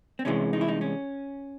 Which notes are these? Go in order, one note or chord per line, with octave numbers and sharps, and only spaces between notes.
C4
C2 C3 E3 G#3 C#4
D#4
E4
D#4
C#4